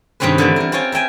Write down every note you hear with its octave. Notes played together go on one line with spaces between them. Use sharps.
G2 C3 D#3 C4 C#4 B4
D3 E3 G3 A3
D3 A#4
C4 F4 C#5 G5 G#5
A#4 E5 G5 G#5